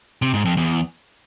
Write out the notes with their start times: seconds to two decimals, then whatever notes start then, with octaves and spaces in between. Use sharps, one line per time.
0.22 C3
0.34 G#2
0.45 F2
0.57 E2